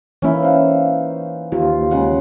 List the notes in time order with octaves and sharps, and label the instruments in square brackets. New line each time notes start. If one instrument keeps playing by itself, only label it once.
[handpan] E3 A#3 [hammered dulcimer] C#4 D#4 E4
[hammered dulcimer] C5 F5 F#5
[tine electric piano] D#2 [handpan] F4
[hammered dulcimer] C#3 G#3 F#5